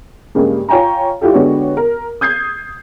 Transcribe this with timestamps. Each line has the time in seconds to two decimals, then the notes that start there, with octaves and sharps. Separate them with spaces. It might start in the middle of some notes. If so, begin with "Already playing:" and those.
0.35 G2 C#3 G#3 A#3 G4
0.68 F4 C#5 G5 G#5 A#5
1.21 G3 E4 F4 G4 A4
1.34 D3 G#3 B3 F#4 G4 C#5
1.77 A#4
2.21 D#6 G6 G#6 C7